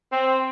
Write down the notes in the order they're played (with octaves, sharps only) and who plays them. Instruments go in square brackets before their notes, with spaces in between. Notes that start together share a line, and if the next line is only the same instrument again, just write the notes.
[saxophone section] C4